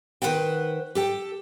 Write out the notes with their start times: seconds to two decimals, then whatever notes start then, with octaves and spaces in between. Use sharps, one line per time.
0.22 D#3 B4 C5 F#5 G5
0.95 G4 A4 G5